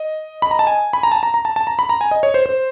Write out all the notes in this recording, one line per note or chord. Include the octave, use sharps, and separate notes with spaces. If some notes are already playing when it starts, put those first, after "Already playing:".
Already playing: D#5
B5
A#5
A5
G#5
B5
A#5
A5
A#5
A#5
A5
A5
A#5
B5
A#5
G#5
D#5
C#5
C5
C5